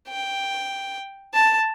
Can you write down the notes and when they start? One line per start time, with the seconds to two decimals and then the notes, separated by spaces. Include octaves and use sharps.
0.08 G5
1.34 A5